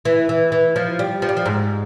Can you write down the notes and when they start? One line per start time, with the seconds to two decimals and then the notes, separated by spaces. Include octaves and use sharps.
0.05 E3
0.29 E3
0.52 E3
0.76 F3
0.99 G3
1.22 F3
1.29 G3
1.37 F3
1.46 G#2